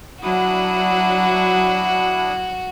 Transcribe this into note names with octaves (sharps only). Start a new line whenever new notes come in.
F#3 D4 E4 F#4 D#6